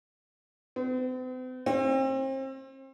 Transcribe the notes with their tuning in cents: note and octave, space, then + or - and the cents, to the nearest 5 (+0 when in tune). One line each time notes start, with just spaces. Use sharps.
C4 -45
C4 +35